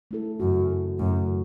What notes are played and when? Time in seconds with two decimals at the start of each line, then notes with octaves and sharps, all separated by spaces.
0.11 A3 E4 A4
0.40 F#2 C#3 E3 A3 F#4
0.70 A3 E4 A4
0.99 F#2 C#3 A3 E4
1.28 E3